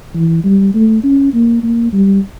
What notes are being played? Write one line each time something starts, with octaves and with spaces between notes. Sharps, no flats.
E3
G3
A3
C#4
A#3
A#3
G3